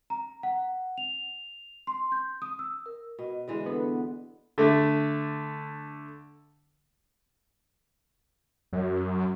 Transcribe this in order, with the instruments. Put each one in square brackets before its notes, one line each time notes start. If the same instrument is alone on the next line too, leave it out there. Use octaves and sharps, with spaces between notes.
[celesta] A#5
F#5
F7
C6
G6
D#6
E6
[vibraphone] A#4
[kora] B2 [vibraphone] D#5
[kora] D3 E3 G#3
[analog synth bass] B3 [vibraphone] D4 A4
[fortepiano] D3 A3
[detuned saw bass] F#2